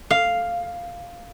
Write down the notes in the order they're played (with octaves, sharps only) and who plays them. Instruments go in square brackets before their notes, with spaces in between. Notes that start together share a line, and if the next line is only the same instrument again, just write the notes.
[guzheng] F5